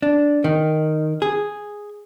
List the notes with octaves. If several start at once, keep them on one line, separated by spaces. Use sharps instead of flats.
D4
D#3
G#4